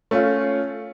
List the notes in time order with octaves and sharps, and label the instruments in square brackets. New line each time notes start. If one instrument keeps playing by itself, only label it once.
[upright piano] A3 C#4 F4